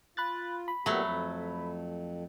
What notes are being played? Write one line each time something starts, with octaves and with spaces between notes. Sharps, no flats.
F4 B5 F#6 A6
B5
A#2 F#3 A3 B3 G4
F2